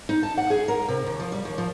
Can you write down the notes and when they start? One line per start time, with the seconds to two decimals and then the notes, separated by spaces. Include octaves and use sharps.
0.09 D#4
0.23 A5
0.38 F#5
0.50 G#4
0.68 A#4
0.88 C3
1.07 D#2
1.20 F3
1.32 G3
1.45 D#2
1.58 F3